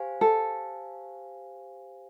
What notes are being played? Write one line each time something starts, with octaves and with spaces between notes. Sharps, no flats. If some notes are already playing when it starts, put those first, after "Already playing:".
Already playing: G4 C5 F5 G#5
A4